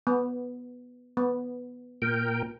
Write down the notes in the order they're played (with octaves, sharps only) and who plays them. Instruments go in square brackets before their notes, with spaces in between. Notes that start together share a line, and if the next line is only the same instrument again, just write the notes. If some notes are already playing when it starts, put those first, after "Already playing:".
[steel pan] B3
B3
[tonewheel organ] A#2 A#4 G5